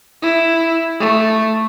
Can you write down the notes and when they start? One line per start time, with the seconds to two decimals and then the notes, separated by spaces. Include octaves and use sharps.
0.22 E4
1.00 A3